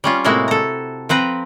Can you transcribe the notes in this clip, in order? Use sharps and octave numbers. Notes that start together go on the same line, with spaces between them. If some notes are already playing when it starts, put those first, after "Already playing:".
G3 C#4 F4
A2 C3 G#3 A#3 E4 F#4
A4 A#5
F3 C4 B4 A#5